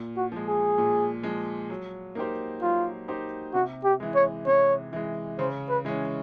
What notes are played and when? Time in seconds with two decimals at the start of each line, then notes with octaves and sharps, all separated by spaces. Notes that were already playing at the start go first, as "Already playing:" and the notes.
Already playing: A#2
0.17 F#4
0.32 F3 G#3
0.47 G#4
0.78 A#2
1.23 F3 G#3
1.70 F#3
2.15 A#3 D#4 G4 C5
2.61 F#3 F4
3.08 A#3 D#4 G4 C5
3.54 C3 F#4
3.84 G4
4.00 E3 G#3
4.15 C#5
4.46 C3 C#5
4.93 E3 G#3
5.39 C#3 C5
5.69 B4
5.85 E3 G#3 C#4